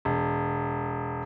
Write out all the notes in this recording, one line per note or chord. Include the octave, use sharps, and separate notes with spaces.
E1